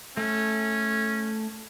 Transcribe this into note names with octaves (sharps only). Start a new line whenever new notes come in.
A3 C#4